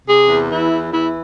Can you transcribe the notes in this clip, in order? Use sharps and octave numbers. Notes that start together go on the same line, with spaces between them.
C3 G#4
E2
E3 E4
E2
E3 E4